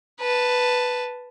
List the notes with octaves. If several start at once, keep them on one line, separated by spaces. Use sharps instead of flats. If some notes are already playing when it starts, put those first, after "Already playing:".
B4 A5